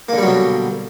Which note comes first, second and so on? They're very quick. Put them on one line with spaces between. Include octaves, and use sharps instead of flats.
A#3 D3 G3 F#3 B2